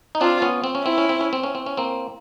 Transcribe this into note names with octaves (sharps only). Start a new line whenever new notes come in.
D#4
C4 D4 F4
B3 C#4
C4
C#4
C4 E4
C#4
C4
C#4
C4
C#4
C4
C#4
A#3 C4